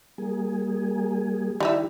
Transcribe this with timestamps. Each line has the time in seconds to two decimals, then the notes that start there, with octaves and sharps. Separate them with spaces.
0.18 G3 A#3 G#4
1.60 D#3 G3 D#4 E4 G4 E5